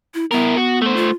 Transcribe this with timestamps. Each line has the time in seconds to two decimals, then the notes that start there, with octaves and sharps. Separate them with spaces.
0.14 E4
0.31 B3 E4 A#4
0.57 F#4
0.82 A3 C5
0.96 F4